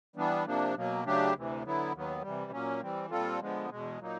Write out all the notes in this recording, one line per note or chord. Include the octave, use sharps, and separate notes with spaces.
E3 G3 B3 D4
C3 F3 A#3 D4
B2 F#3 A#3
C#3 F#3 A3 D4 G4
D2 C3 E3
D3 F#3 B3 E4
D#2 D#3 F#3 B3
C3 E3 G3
A#2 F#3 A#3 C#4
E3 G3 C4
A#2 G3 C4 F4 A4
D3 F3 G#3 B3
E2 B2 G#3
A#2 F#3 A#3 D#4